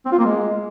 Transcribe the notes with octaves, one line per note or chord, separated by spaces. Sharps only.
C4
F4
A#3
G#3